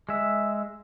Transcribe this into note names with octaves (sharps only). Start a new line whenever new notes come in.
G#3 E5